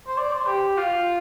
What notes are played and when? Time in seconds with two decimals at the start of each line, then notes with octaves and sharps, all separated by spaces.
0.07 C5
0.17 D5
0.32 C5
0.47 G4
0.78 F4